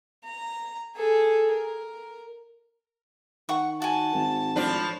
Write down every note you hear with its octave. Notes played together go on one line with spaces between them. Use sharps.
A#5
G#4 A4
A#4
D#3 F#5 C#6
F#4 G#5 A5
G#1
A2 F3 D4